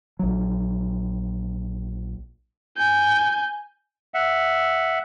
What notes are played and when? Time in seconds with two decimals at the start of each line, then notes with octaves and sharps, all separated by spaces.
0.19 A#1 F#3
2.77 G#5 G6
4.14 E5 F#5